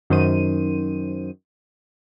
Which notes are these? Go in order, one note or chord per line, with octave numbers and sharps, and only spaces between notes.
F#2 D#3 C5 D#7